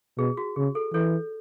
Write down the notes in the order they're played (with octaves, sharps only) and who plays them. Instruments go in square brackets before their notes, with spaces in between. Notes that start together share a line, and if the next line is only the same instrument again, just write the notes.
[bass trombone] B2 [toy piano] G#4
[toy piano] F#4
[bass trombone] C#3 [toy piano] G#4
[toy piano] A4
[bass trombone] E3 [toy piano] A4 C#5